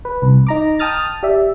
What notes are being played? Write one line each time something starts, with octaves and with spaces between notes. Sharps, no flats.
B4
C2
D#4 A#5 D6
G5 A5 D#6 F6 A6
G4 D5 E5